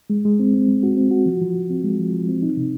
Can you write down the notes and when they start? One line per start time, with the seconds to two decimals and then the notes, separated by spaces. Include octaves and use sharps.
0.10 G#3
0.25 G#3
0.39 C4
0.54 C4
0.69 G#3
0.83 F#4
0.97 C4
1.11 F#4
1.26 F3
1.41 F3
1.55 F3
1.70 C4
1.84 G#3
1.99 F3
2.13 F3
2.28 C4
2.42 D#4
2.57 C3